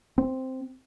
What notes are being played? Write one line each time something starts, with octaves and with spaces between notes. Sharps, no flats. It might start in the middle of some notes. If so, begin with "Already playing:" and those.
C4